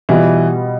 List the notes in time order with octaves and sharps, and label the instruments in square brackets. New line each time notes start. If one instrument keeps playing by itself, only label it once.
[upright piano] B2 G3 B3 F4 [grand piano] E3